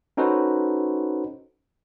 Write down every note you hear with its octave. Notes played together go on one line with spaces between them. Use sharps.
C#4 D#4 F#4 A4 B4 C5